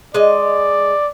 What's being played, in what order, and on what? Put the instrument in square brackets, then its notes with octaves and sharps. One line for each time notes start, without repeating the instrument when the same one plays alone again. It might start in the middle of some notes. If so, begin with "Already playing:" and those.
[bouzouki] G#3 D#5 [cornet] D5